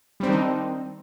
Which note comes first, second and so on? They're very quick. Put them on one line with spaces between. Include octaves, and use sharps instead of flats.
G3 C4 D4 D#3 D#4